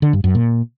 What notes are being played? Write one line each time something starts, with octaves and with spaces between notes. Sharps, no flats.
D3
G2
F#2
A#2